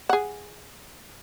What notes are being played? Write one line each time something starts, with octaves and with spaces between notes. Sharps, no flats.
G#4 F#5